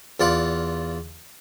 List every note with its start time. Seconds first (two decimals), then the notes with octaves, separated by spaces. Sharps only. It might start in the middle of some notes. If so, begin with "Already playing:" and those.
0.20 E2 F4 D5 F#5